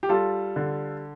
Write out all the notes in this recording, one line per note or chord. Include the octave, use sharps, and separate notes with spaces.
G4
G3 F4 A4
D3